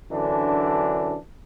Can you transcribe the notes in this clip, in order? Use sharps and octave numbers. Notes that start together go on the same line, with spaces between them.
F#2 D3 E3 D4